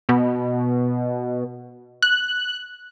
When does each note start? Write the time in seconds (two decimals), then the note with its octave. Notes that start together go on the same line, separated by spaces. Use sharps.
0.09 B2
2.02 F#6